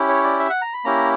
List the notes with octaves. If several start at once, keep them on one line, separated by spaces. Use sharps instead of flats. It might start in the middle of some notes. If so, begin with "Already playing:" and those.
Already playing: C#4 E4 G4
C#5
D5
E5
F#5
A#5
B5
A#3 C#4 E4 G4 A#5